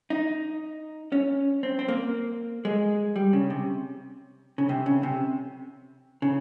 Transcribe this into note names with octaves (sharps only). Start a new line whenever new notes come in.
D#4
C#4
C4
C4
A#3
G#3
G3
C#3
C3
C#3
C3
C#3
C3
C#3